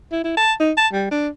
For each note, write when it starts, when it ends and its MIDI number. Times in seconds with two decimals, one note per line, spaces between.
0.12 0.23 64
0.24 0.36 64
0.37 0.53 81
0.60 0.72 63
0.77 0.87 81
0.93 1.08 55
1.11 1.29 62